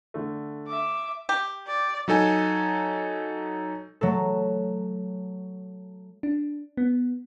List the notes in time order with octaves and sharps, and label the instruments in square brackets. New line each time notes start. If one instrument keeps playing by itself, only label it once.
[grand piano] D3 A3
[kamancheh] E5 D6
[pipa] G4
[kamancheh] D5
[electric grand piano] F#3 D#4 A4 G#5
[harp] F#3 A3 A4
[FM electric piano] D4
B3